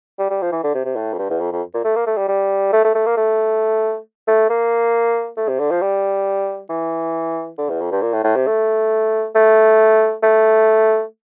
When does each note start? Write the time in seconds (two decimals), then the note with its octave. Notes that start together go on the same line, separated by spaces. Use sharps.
0.19 G3
0.30 G3
0.42 F3
0.52 E3
0.64 D3
0.74 C3
0.85 C3
0.96 A2
1.13 F2
1.18 G2
1.30 E2
1.40 F2
1.52 F2
1.74 A#2
1.84 A3
1.96 A#3
2.06 A3
2.18 G3
2.28 G3
2.73 A3
2.84 A3
2.95 A3
3.06 A#3
3.17 A3
4.28 A3
4.50 A#3
5.37 A3
5.48 C3
5.59 D3
5.71 F3
5.82 G3
6.70 E3
7.58 D3
7.70 E2
7.81 F2
7.91 G2
8.02 A#2
8.13 A2
8.24 A2
8.36 C3
8.47 A3
9.35 A3
10.23 A3